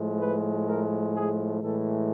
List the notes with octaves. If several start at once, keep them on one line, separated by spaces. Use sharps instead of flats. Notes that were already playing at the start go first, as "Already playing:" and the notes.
Already playing: A2 F3 G#3
B4
A#4
G#4
A2 E3 G#3 A4